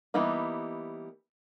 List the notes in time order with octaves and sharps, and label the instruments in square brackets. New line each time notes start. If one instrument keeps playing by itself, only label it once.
[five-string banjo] E3 G3 A#3 B3 D#4